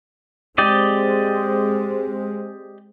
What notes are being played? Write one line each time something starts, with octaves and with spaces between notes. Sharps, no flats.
G#3 C4 G4 D5 D#5